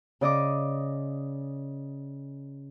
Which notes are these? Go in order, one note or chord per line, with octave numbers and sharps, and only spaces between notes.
C#3 D5 D#5 D6